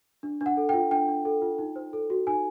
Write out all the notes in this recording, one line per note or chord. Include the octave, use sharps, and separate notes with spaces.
D4
D4
F#5
A4
F4 G5
D4 G5
D4
A4
F4
D#4
C5
A4
F#4
D#4 G#5